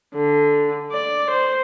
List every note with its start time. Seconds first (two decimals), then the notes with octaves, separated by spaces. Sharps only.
0.15 D3
0.92 D5
1.30 C5